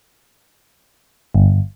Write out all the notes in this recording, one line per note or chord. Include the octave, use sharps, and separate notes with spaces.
G1